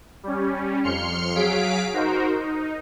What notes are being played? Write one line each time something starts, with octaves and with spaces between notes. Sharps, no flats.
G3 C#4
F2 C6 F6 C#7
F#3 G#4 F5 B6 D7
D#4 F#4 A#4 C5
D#4